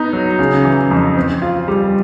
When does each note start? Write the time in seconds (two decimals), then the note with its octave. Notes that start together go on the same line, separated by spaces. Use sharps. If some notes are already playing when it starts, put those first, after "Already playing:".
Already playing: B3 D#4
0.13 F#3
0.39 C#3
0.65 E3
0.91 F2
1.17 C4
1.42 F4
1.68 G3